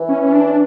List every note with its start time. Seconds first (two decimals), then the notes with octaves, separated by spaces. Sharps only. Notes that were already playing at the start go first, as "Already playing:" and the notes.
Already playing: E3
0.09 C#4
0.22 C#4
0.32 D4